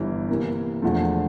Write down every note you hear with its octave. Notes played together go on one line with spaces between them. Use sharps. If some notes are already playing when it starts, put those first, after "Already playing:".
Already playing: G1 G2 E3
C3 E3 A#3
E1 E2 D3 F3 A3